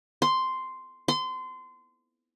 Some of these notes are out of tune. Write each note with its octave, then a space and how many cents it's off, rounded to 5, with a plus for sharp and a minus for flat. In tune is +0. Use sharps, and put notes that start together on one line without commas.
C6 -5
C6 -25